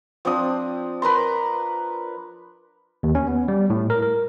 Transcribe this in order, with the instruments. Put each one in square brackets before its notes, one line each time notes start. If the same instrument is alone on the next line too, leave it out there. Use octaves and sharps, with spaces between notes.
[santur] F3 C4 D4 D#6
A#4 B4 A#5 C6
[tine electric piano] D#2
C#4
B3
G3
A2
A#4
A#4